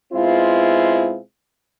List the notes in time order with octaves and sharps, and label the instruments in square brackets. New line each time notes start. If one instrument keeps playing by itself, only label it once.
[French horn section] B2 G#3 C4 E4 F4